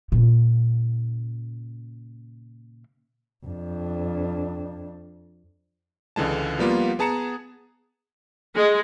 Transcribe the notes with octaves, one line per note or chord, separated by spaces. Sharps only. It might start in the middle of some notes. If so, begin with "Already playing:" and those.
A#2 C#3
F2 D4
C#2 D3 E3 G#3 A5
F3 G3 A#3 B3 F4
B3 G#4 A5 A#5 C#7 E7
G#3